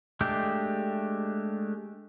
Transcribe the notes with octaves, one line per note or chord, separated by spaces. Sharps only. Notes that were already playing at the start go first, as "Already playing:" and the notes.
G#3 A3 D4 G4 G6